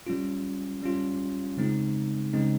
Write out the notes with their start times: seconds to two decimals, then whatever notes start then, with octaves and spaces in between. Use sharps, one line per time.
0.06 G3 C#4 F4
0.82 G3 C#4 F4
1.57 C#3 G#3 C4 D#4
2.33 C#3 G#3 C4 D#4